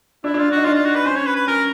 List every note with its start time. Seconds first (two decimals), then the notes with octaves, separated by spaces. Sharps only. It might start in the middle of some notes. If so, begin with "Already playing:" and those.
0.24 D4 E4
0.34 D4
0.38 F4
0.51 D#4 F#4
0.65 D4 F4
0.75 F4
0.85 F#4
0.96 B4
1.06 C#4 C5
1.16 C#5
1.26 B4
1.36 B4
1.47 C#4 A#4